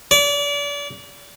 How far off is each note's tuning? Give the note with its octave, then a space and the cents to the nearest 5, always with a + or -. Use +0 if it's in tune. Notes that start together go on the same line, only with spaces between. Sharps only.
D5 -35